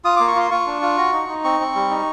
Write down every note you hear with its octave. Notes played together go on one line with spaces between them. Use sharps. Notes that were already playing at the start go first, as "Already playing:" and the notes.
F4 D#6
A#3 D6
C#6
F4 C6
F4 C#6
D4
F4
F#4
D#4
D#4
C4 C#6
C4
G3
D#4